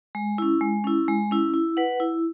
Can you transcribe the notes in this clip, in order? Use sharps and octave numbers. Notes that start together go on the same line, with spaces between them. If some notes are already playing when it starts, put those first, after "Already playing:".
G#3
C#4 E4
G#3
C#4 E4
G#3
C#4 E4
E4
B4 F#5
E4